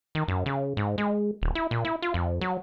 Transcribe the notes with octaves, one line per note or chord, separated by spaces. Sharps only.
D#3
F#2
C#3
G#2
G#3
D#1
E4
A#2
E4
F4
F2
F#3